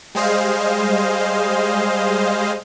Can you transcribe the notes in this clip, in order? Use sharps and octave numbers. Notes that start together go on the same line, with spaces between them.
G3 G#3 G#4 C5 D#5 F5